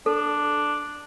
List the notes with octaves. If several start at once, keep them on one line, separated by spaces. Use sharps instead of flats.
D4 A4